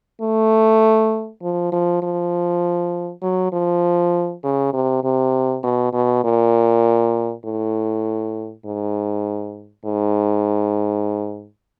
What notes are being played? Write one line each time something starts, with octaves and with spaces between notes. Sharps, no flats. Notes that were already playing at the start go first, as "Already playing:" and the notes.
A3
F3
F3
F3
F#3
F3
C#3
C3
C3
B2
B2
A#2
A2
G#2
G#2